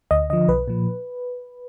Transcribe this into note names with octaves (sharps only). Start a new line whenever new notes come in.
D2 D#5
D3 F3 D#5
B1 B4
A#2 F3